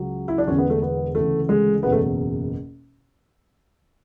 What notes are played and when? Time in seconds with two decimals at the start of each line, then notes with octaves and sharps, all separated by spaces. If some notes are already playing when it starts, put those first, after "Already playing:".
Already playing: C#2 C#3 F#3
0.28 E4
0.38 D4
0.47 E1 E2 D3 C#4
0.58 B3
0.70 A3
0.82 B3
1.15 D2 C#3 E3 A3
1.49 G#3
1.83 F#1 E2 B2 B3
1.92 A3